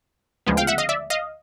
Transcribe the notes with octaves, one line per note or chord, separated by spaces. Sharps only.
D2 C#3 F3 G#3 B3
F5 G5
E5 F#5
D#5 F5
D5 E5
D#5 F5